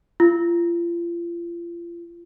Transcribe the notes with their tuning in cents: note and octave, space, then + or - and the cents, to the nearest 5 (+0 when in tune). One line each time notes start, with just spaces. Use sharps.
F4 -35